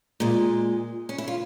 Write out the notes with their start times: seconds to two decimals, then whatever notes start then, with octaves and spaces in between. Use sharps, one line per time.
0.20 A#2 G#3
1.09 C#4
1.18 E4
1.28 F4